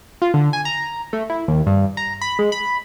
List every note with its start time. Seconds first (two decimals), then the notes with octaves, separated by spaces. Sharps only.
0.22 F4
0.34 D3
0.53 G#5
0.65 A#5
1.13 A3
1.30 E4
1.48 D#2
1.67 G2
1.97 A#5
2.21 B5
2.39 G#3
2.52 B5